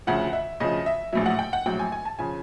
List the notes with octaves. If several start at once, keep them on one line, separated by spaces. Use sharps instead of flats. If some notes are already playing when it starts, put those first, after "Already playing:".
D2 C#3 F3 F#5
E5
D2 C#3 F3 D#5
E5
A#1 A2 F#3 E5
F#5
G5
F#5
A#1 A2 F#3 G5
G#5
G#5
A5
C#3 F3 G#5